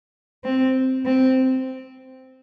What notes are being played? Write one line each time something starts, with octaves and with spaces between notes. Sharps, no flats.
C4
C4